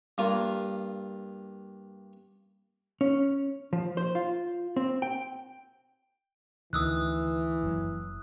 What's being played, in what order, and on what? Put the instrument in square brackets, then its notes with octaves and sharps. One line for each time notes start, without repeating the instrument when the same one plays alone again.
[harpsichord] G2 A#3 F4
[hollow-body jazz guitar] C#4
F3
C5
F4
C4
G5
[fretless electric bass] D2 D#3 [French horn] E3 [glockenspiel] D#6 E6 F#6
[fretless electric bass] F#1 F#3